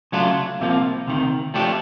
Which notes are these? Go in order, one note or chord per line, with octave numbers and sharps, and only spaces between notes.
C#3 F#3 A3 D4 F4
C2 C3 F3 A#3
D2 C3 D#3
F3 A3 D4 G4